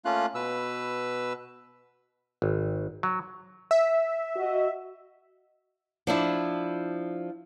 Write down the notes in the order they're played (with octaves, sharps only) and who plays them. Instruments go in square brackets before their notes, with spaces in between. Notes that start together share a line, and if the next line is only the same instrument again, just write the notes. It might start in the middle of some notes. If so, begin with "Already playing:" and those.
[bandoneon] A3 A#3 C#4 F4 F5 F#6
B2 B4 E6
[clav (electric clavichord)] G#1
F#3
[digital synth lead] E5
[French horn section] F#4 D#5
[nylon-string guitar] F3 D4 E4